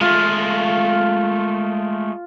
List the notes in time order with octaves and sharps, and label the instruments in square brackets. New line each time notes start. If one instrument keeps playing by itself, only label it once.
[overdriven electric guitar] G#3 A3 [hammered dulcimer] F4